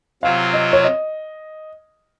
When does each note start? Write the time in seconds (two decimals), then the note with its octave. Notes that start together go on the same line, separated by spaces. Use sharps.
0.23 C3 F#3 C4 F4 F5
0.53 D#5
0.73 C#5
0.84 D#5